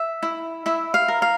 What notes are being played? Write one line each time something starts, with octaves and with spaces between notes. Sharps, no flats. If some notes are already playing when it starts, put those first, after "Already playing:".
Already playing: E5
E4
E4 E5
F5
A#4
F5